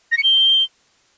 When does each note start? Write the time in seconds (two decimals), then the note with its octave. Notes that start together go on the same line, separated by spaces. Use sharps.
0.12 A#6
0.18 C#7
0.23 G7